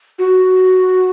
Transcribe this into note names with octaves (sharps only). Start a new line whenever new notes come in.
F#4